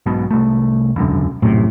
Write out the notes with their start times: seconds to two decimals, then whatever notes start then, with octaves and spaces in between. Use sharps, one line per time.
0.06 B1 G#2 B2
0.31 C2 A3
0.96 E1 C#2 F#2 D3
1.42 A#1 F#2 A2 C3